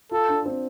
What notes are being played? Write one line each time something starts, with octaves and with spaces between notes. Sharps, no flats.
F4 A4
D4
C4